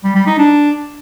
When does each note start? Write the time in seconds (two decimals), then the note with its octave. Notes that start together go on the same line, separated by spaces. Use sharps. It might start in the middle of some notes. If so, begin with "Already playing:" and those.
0.04 G3
0.15 G3
0.27 D#4
0.38 D4